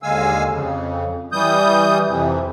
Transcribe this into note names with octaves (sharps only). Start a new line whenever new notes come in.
D#2 D3 G#3 F5 G#5 E6
F2 C#3
E3 G3 D#6 G6
F2 C3 E3